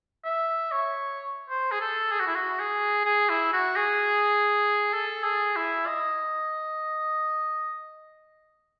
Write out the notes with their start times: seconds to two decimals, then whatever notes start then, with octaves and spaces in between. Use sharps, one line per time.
0.25 E5
0.72 C#5
1.49 C5
1.72 G#4
1.80 A4
2.12 G#4
2.20 F#4
2.27 E4
2.35 F#4
2.59 G#4
3.05 G#4
3.29 E4
3.53 F#4
3.76 G#4
4.93 A4
5.24 G#4
5.56 E4
5.87 D#5